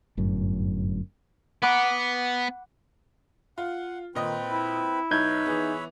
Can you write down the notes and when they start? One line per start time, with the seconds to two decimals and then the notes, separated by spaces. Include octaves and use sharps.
0.17 G1 F#2 A2
1.62 B3 F#5 B5 D6
3.58 F4 F#5
4.15 A#2 D#3 C4 B4 D#5
4.49 E4
5.11 B1 D#4 B4 C#5 E5 G6 G#6
5.46 E3 B3 G#4